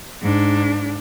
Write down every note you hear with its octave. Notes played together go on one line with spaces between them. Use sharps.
G#2 D4